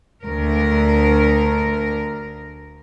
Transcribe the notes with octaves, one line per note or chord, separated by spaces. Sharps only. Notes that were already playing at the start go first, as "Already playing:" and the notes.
D2 A#4